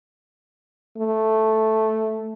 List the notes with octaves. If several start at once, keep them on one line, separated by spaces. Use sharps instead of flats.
A3